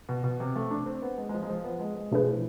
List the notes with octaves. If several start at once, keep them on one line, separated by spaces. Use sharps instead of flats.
B2
B2
C3
A3
D4
C4
B3
G#3
G#3
F3
G#3
F3
B3
G#3
G#3
B2 F3 A3 D4 G#4 B4
F3
E3